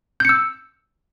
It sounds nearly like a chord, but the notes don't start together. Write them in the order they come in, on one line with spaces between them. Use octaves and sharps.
G6 C#7 E6